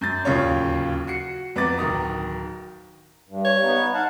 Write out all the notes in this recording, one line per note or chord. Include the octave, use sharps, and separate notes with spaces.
F#2 G6 A6
D1 D#2 C#3 F4 C#5
F#4 C7 C#7
F2 B3 F#4 A#5 D6 A6
D1 D#3 A#5 D#6
G2
C#5
B3 D#4
F5 F#5 A5